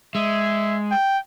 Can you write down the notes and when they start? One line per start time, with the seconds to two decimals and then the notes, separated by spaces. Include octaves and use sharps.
0.15 G#3 E5
0.91 G5